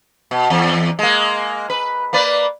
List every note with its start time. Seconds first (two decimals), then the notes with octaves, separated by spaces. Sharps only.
0.31 B2
0.50 E2
0.99 G#3 A#3
1.70 B4
2.13 A#3 B4 D5